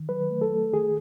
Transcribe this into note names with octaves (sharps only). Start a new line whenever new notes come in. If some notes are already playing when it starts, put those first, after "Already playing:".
Already playing: D#3
F#3 B4
A3
A4
A3
D#3 G#4